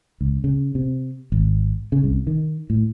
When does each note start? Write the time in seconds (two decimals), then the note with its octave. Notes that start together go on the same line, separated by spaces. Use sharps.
0.21 C#2
0.44 C#3
0.75 C3
1.32 G#1
1.92 C#3
2.04 C2
2.27 D#3
2.70 A2